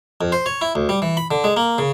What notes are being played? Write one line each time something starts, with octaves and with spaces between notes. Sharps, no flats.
F2
C5
C#5
E4
D2
G3
E3
B5
D3
G#3
A#3
C#3